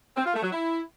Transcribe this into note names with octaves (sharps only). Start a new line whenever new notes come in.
C4
F4
A3
F#3
E4